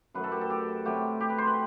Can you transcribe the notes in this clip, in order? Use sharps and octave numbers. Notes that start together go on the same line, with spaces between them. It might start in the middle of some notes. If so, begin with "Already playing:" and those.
F#2 F#3 A3 B4
A4
G4
A4
G4
C3 F#3 A3 G4
G4
B4
C5
B4